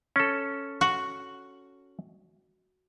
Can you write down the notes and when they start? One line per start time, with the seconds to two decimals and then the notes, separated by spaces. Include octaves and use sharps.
0.16 C#4 A4
0.81 F#4